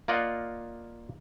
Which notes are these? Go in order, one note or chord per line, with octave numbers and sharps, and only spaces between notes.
A#3 F4 D5 D#5 F#5